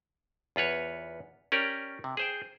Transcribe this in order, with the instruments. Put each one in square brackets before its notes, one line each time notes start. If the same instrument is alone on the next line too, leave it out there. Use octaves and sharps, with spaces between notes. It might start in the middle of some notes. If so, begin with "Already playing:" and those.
[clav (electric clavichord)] E2 F4 B4 C#5
C#4 G4 A#4 D5
C3
G#4 C5 G5